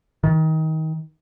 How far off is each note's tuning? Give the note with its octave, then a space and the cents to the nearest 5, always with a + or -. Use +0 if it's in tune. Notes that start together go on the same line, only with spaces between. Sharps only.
D#3 +25